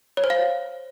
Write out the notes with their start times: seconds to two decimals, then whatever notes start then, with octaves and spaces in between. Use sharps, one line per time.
0.17 C#5
0.24 C5
0.30 F5